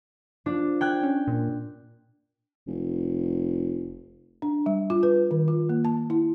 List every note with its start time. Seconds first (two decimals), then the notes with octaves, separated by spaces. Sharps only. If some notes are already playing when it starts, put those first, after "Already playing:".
0.46 F3 D4
0.81 G5 F#6 G#6
1.03 C#4
1.27 A#2
2.68 F1
4.42 D4
4.66 G3
4.90 F4
5.03 B4
5.31 D#3
5.48 F4
5.69 A#3
5.85 A5
6.10 E4